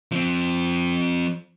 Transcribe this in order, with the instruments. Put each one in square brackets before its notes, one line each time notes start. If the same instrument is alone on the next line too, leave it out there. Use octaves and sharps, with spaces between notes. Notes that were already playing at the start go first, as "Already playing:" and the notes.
[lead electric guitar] F3 C4